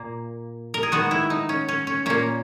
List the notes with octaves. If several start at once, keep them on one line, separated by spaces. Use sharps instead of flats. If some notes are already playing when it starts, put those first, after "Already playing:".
Already playing: A#2 A#3
A#4
G#4
D#3 G#3 B3 F#4
E4
D#4
C#4
C#4
C#4
A#2 A#3 C#4